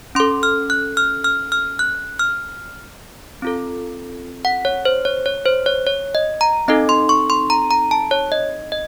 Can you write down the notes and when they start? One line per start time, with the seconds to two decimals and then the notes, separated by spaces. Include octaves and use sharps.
0.15 C#4 C6
0.20 A4
0.43 F6
0.70 F#6
0.97 F6
1.24 F6
1.52 F6
1.79 F#6
2.19 F6
3.42 C4 F4 A4
4.45 F#5
4.65 C#5
4.85 C5
5.05 C#5
5.26 C#5
5.46 C5
5.66 C#5
5.86 C#5
6.15 D#5
6.41 A#5
6.68 C4 D#4 A4 D#5
6.89 C6
7.09 C#6
7.30 C6
7.50 A#5
7.71 A#5
7.91 A5
8.11 C#5
8.32 D#5
8.72 D#5